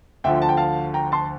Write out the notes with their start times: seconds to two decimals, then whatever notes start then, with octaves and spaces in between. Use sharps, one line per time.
0.24 D2 D3 F3 E5 G5
0.42 A5
0.49 G5
0.57 F5 A5
0.94 G5 A#5
1.12 A5 C6